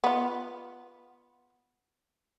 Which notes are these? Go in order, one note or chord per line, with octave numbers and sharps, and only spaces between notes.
B3 F4